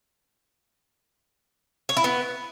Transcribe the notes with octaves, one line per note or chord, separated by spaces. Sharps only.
C#5
E4
B3